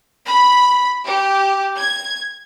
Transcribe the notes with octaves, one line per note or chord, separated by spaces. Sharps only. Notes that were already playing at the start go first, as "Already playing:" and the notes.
B5
G4
G#6